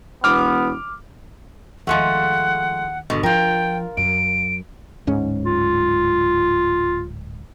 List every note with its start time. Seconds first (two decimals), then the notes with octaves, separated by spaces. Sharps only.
0.24 E1 B3 D6 F6
1.87 D#2 F3 G#3 A3 F#5
3.10 G#1 B2 D3
3.23 F3 F4 A#4 G5
3.97 F#2 D7
5.07 D1 G#2 C#4
5.45 F4